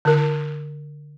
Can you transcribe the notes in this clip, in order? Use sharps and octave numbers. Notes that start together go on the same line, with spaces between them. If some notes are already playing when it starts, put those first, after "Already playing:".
D3 A#4